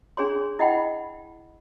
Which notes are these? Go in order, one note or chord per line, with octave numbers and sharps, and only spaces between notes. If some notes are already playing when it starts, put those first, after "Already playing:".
D4 G#4 C#5 C6
E4 D#5 F#5 G5 B5